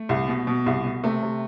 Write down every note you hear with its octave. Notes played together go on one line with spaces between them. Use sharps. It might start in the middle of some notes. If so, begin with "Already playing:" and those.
Already playing: A3
C2
B2
B2
C2
B2
C3 A3
C3